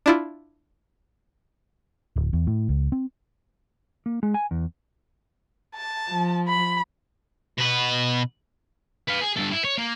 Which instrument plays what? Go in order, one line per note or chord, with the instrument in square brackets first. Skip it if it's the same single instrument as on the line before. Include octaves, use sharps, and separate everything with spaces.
[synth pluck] D4 E4 F4
[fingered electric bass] D1
E2
A2
C#2
C4
[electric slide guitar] A#3
G#3
G#5
E2
[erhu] A5
[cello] F3
[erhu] B5
[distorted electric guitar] B2 B4
B4 F5
G#4
G2 A4
E4
C#5
A#3